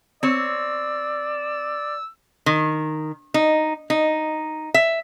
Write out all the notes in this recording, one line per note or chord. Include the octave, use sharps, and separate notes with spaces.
C4 C#5 D5 E6
D#3
D#4
D#4
E5